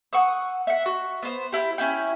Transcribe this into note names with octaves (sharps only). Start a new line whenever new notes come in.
F#5 C#6 D#6 E6
E5 F#5
F#4
B3 C5
E4 G4
C#4 E4 G5